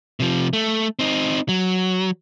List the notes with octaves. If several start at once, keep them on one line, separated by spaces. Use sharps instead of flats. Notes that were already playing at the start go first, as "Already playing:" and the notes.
C3 F3
A3
C4 D#4
F#3